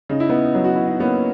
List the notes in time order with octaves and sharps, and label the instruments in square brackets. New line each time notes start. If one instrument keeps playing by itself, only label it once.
[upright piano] C#3 [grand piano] D#4
[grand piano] E4
B3 D#4
[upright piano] F#3
[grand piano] F#4
E4
D#4
[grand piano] A#3 C#4 [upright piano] B3